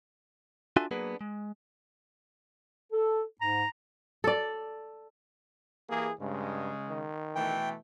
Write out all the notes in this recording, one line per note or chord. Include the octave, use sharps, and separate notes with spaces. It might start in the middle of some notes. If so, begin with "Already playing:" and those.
D4 F4 F#4 A4 E5 G#5
F#3 A#3 B3 D4 G#4 B4
G#3
A4
G#2 A#5
A4 D5
E3 A#3 G4 G#4
G2 C#3 G#3
D#3
B2 E3 A3 G5